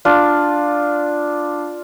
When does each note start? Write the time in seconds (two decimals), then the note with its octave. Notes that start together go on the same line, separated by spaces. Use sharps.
0.05 D4 F4